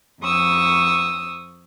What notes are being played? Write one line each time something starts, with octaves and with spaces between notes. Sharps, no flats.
F2 C#6 D#6 E6